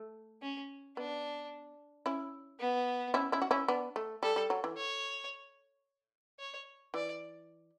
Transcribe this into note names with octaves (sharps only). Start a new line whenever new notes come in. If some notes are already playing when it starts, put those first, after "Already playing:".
Already playing: A3
C#4
B3 D4
C#4 E4
B3
C#4 E4
C#4 E4
F#4
C#4 E4
B3 D4
A3
G3 A4
G3
F#3
E3
C#5
C#5
E3 D5